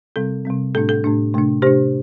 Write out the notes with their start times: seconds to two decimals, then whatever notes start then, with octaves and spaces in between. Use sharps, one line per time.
0.16 C3 G3 C4 A4
0.45 C3 G3 C4
0.75 A2 A3 D4 A4
0.89 A4
1.04 A2 A3 D4
1.34 C3 A3 D4
1.62 C3 A3 D4 G4 C5